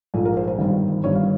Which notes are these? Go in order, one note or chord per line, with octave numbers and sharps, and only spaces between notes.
A#1 G#2 F3 A4
A#4
C5
C5
G1 G2 D#3
G1 G2 D#3 C#5
F5